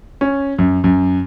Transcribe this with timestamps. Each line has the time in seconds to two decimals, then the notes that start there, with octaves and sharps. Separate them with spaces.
0.21 C#4
0.58 F#2
0.84 F#2